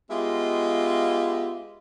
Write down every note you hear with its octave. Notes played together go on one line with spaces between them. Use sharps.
G#3 B3 F4 G4 D#5 E5